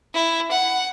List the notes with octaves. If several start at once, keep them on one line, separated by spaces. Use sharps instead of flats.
E4
F#5